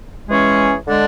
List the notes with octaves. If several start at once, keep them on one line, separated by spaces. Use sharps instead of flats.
E3 G#3 C#4 G#4 C#5
D3 G#3 D4